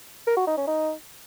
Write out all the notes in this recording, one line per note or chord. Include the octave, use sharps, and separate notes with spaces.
A#4
F#4
D#4
C#4
D#4